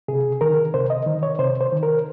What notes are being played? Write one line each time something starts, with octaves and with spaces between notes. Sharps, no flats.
C3 G#4
D#3 A#4
C3 C5
D#5
D#3
C#5
C3 C5
C5
D#3
A#4